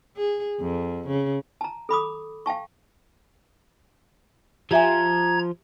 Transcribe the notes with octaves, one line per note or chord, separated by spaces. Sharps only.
G#4
F2
C#3
A5 A#5
A4 B5 D6 D#6
F5 G5 A5 C#6
F3 G4 E5 G#5 A#5 G#6